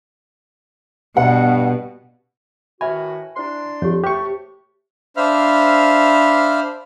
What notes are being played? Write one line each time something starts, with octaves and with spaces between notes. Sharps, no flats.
G2 B2 F#5
A2 D#3 F#4 B4 E5 G#5 B5
D4 E4 C5 C6
F2 G4 C#5
A3 G4 C5 C#6
D4 C5 E5 F5 B5 F6